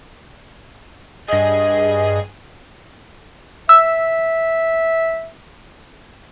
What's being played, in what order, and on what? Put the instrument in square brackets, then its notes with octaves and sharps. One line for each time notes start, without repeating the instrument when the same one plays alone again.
[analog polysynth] G2 G#4 [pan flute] D#5
[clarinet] E5 [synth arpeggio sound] E6